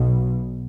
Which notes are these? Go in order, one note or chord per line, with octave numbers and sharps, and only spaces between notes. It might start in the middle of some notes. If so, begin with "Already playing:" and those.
Already playing: B1 B2